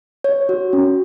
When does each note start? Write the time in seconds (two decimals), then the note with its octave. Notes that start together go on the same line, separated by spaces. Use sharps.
0.24 C#5
0.49 F#4
0.73 C#4